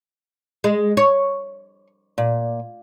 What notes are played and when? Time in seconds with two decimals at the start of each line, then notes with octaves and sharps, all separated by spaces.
0.64 G#3
0.97 C#5
2.18 A#2